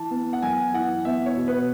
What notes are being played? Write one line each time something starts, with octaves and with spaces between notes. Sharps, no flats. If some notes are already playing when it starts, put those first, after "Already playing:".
Already playing: E3 A5
B3
F#5
F#2 G#5
E3 F#5
B3 E5
C#5
B2
B4